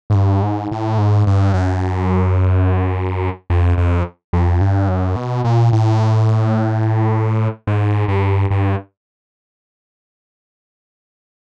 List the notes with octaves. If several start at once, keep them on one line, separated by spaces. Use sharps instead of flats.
G#2
G2
G#2
A2
G#2
G2
F#2
F2
F2
F2
G2
F#2
B2
A#2
A2
G#2
G2
G2